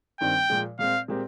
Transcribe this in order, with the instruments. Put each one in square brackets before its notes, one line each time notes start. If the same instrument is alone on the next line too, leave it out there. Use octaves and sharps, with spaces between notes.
[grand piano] G2 D#3 G3 C4 [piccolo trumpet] G5
[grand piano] A#2 F3 G#3
[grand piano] A#2 G#3 C4 [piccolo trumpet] F5
[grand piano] A#2 G#3 C4 G4 A#4